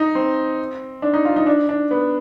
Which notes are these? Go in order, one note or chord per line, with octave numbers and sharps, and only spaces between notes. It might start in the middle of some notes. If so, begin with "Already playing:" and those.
Already playing: D#4
C4
D4
D#4
F4
D#4
D4
D4
B3